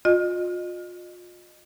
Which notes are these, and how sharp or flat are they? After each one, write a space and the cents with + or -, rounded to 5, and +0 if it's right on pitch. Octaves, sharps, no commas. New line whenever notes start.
F4 +35 D#5 -30